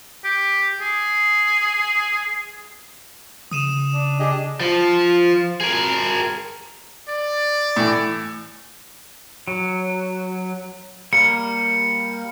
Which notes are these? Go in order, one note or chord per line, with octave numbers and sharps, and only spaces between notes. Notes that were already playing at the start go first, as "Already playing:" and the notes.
G4
G#4
C#3 D#6 D#7 E7
D4
D4 G4 G#4 D#5
F3
G#4 A#4
D5
A2 E3
F#3
G3 A#3 C#7